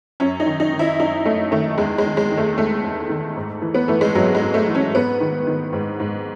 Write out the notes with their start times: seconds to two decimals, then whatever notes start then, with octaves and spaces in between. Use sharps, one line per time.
0.20 F#2 C#4
0.40 D#4
0.46 D#3
0.60 D#4
0.73 D#3
0.79 E4
0.99 F#2 D#4
1.26 F#2 A3
1.51 D#3 A3
1.78 E2 G#3
1.98 G#3
2.05 D#3
2.17 G#3
2.31 D#3
2.37 A3
2.57 E2 A3
2.84 E2
3.09 D#3
3.36 G#2
3.62 E3
3.74 B3
3.88 E3 A3
4.01 G#3
4.15 G#2 F#3
4.35 G#3
4.41 G#2
4.54 A3
4.68 E3
4.75 C#4
4.94 G#2 B3
5.20 D#3
5.47 D#3
5.73 G#2
6.00 G#2